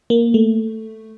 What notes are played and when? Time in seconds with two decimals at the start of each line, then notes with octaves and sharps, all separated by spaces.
0.10 A#3
0.34 A3